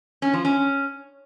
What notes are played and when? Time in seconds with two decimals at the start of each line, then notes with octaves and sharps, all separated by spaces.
0.22 C#4
0.33 F3
0.45 C#4